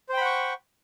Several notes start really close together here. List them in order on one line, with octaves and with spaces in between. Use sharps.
C5 G5 B5 F#5 C#6